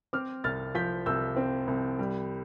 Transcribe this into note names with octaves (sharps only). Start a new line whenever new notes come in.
C4 D6 F6
C2 F6 A6
F3 G6 B6
C2 E6 G6
C4
C2
G3